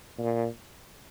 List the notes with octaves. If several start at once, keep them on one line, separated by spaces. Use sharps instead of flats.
A#2